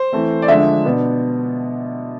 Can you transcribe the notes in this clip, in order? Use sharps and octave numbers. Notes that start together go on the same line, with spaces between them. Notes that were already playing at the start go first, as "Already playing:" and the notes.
Already playing: C5
E3 A3 C4
D5
D3 F3 G#3 D4 E5
B2 B3 D4